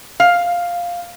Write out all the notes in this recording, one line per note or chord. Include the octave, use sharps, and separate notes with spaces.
F5